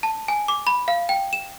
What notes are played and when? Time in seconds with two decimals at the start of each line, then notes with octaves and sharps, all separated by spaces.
0.03 A5
0.28 G#5
0.48 D6
0.67 B5
0.88 F5
1.09 G5
1.33 E7